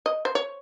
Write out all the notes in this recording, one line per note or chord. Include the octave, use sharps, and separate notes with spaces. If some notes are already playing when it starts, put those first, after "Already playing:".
D#5
C5
C#5